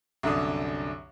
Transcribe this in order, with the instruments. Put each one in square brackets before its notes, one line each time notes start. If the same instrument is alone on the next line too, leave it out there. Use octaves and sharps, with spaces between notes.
[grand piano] C2 F#2 D3 D4 D#6